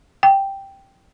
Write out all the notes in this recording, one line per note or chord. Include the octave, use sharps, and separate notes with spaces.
G5